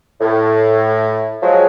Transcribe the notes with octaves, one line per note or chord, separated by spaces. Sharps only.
A2
F3 F#3 G#3